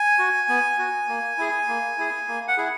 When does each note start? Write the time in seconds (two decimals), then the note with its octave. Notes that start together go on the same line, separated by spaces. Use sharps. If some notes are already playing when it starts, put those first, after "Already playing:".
Already playing: G#5
0.19 F#4
0.49 B3
0.79 F#4
1.09 A#3
1.38 E4 G#4
1.68 A#3
1.98 E4 G#4
2.28 A#3
2.48 F#5
2.58 E4 G#4